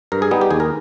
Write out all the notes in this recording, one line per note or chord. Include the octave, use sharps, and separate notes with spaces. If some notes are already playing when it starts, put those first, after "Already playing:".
G2 A#4
G#4
G3 B3 D#4
G4
D#2 G#4
A#4